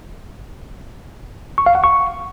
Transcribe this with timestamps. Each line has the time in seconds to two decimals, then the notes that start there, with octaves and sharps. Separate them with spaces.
1.58 C#6
1.66 F5
1.75 F#5
1.84 C#6